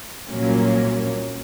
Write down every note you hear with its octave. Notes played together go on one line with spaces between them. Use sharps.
C2 A#2 F#3 A#3 C#4